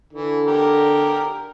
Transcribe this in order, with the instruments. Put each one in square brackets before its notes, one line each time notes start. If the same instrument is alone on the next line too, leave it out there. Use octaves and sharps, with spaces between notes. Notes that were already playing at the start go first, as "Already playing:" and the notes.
[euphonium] D3 [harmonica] E3
[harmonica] G4 A#4